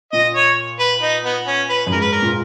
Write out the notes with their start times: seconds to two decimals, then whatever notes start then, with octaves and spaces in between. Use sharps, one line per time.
0.12 A#2 D#5
0.35 C#5
0.79 B4
1.02 D#4
1.25 B3
1.47 C#4
1.70 B4
1.87 F#2
1.92 G#2 A#4
2.01 B4
2.13 A#4
2.22 A#2